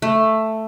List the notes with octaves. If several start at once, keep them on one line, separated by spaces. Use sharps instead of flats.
A3